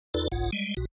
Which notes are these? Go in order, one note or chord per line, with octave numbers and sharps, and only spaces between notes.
E2 D#4 F4 A4 B4 D5
F#1 B1 G#2 F4 F#5
G3 G#3
C2 B2 F#4